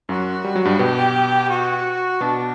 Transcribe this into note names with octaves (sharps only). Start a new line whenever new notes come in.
F#2 F#3 F#4
G3
F#3
G2 G3
B2 B3 G4
F#4
B2 B3 D4